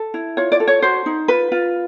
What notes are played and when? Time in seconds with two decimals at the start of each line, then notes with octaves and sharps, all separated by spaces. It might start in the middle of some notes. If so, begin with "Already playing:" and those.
Already playing: A4
0.14 E4
0.37 F4 C#5
0.52 D5
0.60 A4
0.67 C#5
0.82 F#4 C5
1.06 D#4
1.28 F4 B4
1.52 F4